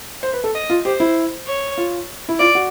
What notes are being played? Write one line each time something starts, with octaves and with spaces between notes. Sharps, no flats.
C5
B4
A4
D#5
F4
G4 C5
E4
C#5
F4
E4
F4 D5
F#4